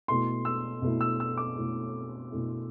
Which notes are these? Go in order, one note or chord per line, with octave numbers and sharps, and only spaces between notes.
B2 A3 E4 C6
E6
B2 A3 E4
E6
E6
D6
B2 A3 E4
B2 A3 E4